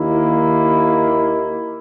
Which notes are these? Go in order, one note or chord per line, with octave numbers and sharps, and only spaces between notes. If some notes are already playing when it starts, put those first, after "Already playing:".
Already playing: D#2 D#3 A#3 E4